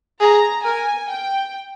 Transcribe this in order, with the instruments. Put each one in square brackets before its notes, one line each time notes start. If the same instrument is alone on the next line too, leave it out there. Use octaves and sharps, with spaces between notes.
[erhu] G#4 [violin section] A#5
[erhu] A#4 [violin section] G#5
[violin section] G5